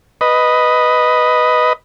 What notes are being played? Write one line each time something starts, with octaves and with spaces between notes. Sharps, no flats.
B4 D#5